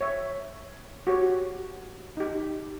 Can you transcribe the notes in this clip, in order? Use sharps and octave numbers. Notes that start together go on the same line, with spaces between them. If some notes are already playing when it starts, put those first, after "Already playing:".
C#5 E5
F#4 G4 C#5
D#4 G4